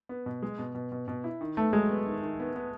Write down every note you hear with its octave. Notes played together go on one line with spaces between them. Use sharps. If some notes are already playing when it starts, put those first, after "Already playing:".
B3
B2
G#3
B2
B2
B2
B2
E4
D#3
A3 B3
F#3 G#3
B3
D#3
D#3
B3
B3